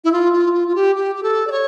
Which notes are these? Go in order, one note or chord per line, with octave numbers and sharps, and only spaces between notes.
E4
F4
F4
F4
F4
G4
G4
G4
A4
D5
C#5